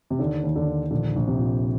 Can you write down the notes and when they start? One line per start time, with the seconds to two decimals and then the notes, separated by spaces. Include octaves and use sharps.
0.10 C3
0.19 D#2 D3
0.44 D#2
0.56 D3
0.68 D#2
0.91 A#1 D3
1.16 A#1
1.28 C3
1.39 A#2